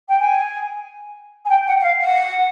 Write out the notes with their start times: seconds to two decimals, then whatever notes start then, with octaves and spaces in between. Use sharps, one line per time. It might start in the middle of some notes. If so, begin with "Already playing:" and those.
0.08 G5
0.20 G#5
1.45 G#5
1.49 G5
1.67 F#5
1.80 F#5
1.83 F5
2.01 F#5